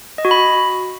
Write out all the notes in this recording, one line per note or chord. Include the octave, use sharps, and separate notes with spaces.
D#5
F#4
B5